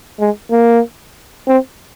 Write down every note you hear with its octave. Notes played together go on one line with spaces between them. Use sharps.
G#3
A#3
C4